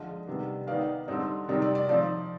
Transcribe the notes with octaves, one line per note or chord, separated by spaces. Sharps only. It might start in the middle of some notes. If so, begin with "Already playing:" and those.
Already playing: D3 F3 G#3 D#5
C3 D#3 G3 B3 D4
D#3 B3 D#4 D5 F5
D3 G3 C4 D#4
C3 D#3 G3 C4 D#4
D5
D5
F3 C4 D#4 D5